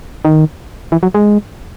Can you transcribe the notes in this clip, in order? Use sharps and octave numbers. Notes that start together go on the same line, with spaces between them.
D#3
E3
F#3
G#3